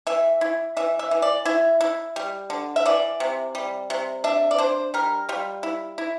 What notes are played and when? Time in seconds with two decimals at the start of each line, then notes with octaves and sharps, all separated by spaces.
0.07 E3 E5
0.41 E4
0.77 E3 E5
0.99 E5
1.11 E3
1.22 D5
1.45 E4 E5
1.81 E4
2.16 G3
2.50 D3
2.76 E5
2.86 E3 D5
3.20 C3
3.55 G3
3.90 C3
4.24 D4 E5
4.51 D5
4.58 D4 C5
4.94 G3 A#4
5.29 G3 F4
5.63 E4
5.98 E4